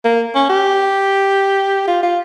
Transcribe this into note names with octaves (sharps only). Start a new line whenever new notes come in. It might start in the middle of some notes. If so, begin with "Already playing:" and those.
A#3
C#4
G4
F4
F4